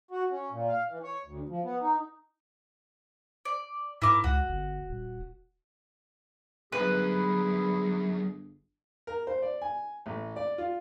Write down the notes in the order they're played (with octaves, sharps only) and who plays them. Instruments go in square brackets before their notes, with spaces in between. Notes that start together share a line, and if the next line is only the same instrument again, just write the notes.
[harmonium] F#4
C#4
A#2
F5
E3
C#5
D2
F3
B3
D#4
[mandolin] D5
[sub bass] G#2 [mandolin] E4 A#4 D6
[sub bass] C#2 [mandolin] F#4
[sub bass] G1
D#1
[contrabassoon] G1 [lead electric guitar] C2 F#2 [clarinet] G#4 [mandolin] B4
[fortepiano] A#4
C5
D5
G#5
A1
D5
F4